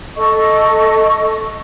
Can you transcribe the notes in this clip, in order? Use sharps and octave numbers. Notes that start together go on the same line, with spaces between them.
A4 D#5 C#6